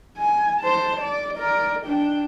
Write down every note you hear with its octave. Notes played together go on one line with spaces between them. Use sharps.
G#5
C5 A5
D5
A#4 D5
D4 G5